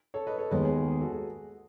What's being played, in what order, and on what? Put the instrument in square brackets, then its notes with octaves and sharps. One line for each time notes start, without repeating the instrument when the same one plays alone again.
[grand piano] A4 C#5
B4 D#5
A4 C#5
[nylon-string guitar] D#2 D#3 G#3 B3 [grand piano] B4 D#5
[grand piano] G#4
G#4
G#4
F#4 A4
G#4